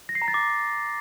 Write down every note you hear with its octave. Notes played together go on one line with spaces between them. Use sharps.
A#6
C7
A#5
A6
D6